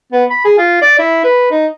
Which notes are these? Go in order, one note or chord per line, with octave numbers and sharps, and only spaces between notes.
B3
B5
G#4
F4
D5
E4
B4
D#4